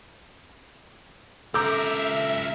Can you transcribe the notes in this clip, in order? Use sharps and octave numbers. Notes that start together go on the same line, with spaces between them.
C#2 A4 A#4 E5 A#5 D6 E6 G6